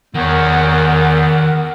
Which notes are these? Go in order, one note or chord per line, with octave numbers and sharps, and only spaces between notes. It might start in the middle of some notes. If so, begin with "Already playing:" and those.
E2 D#3 A#4 C#5 F#5